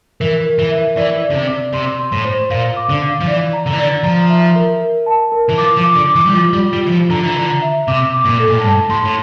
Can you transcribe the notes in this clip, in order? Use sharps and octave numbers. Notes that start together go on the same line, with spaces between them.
E3 A#4
A#4
E3
E5
E3 D5
D5
D3
C3
D5
C3 C6
C6
A2
C5
A#2 F5
D6
D3
F5
F3
E3 D5
A#5
D3
E3
D3 D5
F3 A#5
E5
A#4
A#4
A5
A#4
E3
F3 D6
F3
D6
D3
D6
E3
G3
F3 F4
G3
F4
G3
E3 F4
F3
D3 A#5
E3
D3 A#5
E5
C3 D6
D6
A#2
A4
A#2
A2
G2 A5
A2 C6
A2